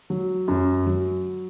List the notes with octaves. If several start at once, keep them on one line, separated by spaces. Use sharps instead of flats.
F#3
F#2
F#3